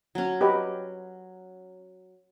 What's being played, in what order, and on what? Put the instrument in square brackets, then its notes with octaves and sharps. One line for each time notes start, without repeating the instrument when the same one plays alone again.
[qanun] F#3 C#4
[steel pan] G4 B4 D#5